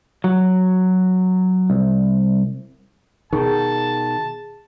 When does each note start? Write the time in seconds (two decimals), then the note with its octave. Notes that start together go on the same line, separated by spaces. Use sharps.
0.24 F#3
1.70 C2
3.33 B2 D#3 G#4 A5